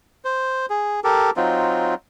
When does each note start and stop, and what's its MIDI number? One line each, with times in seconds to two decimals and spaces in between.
0.25 0.66 72
0.70 1.00 68
1.04 1.30 67
1.04 1.30 69
1.04 1.30 70
1.37 1.95 54
1.37 1.95 60
1.37 1.95 63
1.37 1.95 65